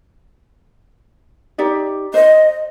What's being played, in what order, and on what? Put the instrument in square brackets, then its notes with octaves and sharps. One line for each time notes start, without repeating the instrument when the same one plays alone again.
[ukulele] D#4 G4 D5
[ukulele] C5 [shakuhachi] D#5